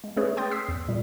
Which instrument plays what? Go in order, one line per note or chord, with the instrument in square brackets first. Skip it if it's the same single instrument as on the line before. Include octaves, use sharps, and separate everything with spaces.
[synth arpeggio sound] G#3
A3 C#4 G#4 B4 C#5
G5 C6 D#6 G6 A6
D#6 E6 B6 C7
E2
A#2 G3